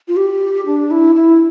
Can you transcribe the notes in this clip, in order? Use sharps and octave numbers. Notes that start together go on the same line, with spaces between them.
F4
G4
D4
E4
E4